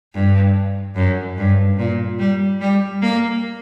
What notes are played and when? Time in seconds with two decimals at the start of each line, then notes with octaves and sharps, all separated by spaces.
0.14 G2
0.96 F#2
1.37 G2
1.78 A#2
2.19 G3
2.61 G3
3.02 A#3